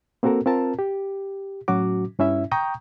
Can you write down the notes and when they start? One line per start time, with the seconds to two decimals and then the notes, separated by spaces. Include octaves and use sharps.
0.23 A#3 C4 F#4 A4 A#4
0.46 C4 F4 A#4 A5
0.79 G4
1.68 A2 F#3 C#4 F#4 D6
2.19 G2 C#4 E4 E5
2.51 G5 A#5 C#6 D#6 G6